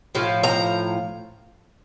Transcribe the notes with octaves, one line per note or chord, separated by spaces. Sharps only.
A2 F3
A#5